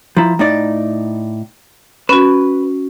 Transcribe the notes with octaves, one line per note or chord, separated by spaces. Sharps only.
F3 E4 A#5
A2 D#4 D5
C#4 F#4 B4